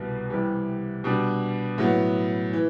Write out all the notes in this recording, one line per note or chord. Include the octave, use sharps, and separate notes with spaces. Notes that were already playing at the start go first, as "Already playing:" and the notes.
Already playing: C2 B2 G3 B3
C3 E3 G3
B2 G3 D4
A2 F#3 B3
E3